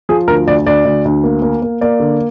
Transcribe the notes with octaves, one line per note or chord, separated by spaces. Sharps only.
F3 G#4
D2 A#4
D2 D5
D2 D5
D2
D2
A#3
A#3
A#3
A#3 D5
D3